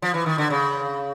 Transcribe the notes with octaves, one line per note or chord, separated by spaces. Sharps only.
F3
E3
D#3
D3
C#3